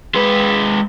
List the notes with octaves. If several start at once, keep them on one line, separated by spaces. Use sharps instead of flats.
G#3 B4